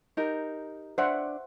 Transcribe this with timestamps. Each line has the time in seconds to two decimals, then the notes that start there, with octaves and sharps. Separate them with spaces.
0.17 D#4 G4 A#4
0.98 D4 C5 E5 F#5